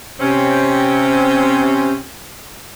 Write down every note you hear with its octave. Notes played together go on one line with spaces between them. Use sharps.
C3 C4 C#4